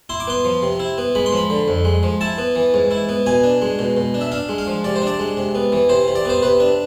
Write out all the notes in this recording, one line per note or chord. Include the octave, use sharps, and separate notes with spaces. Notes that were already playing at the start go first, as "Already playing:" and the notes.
E4 C6
D6
B3 C6
F3
C3
E4
B3
G#3 B5
C6
F3 B5
D3
F2
G#3
F3
E4 A5
B3
E3
G#2
E4
B3
B2 G#5
D4
G#3
B2
B2
D4
E5
D4 F5
G#3
F5
F3
C3 D5
C5
D4
D5
G#3
C3
B3
E3
C3 C5
C3
D5
B3 C5
C3 B4
D4